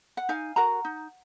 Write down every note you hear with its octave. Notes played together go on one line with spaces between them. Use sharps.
F#5
D#4 F5 G#5
F#4 A#4 F#5 A#5
D#4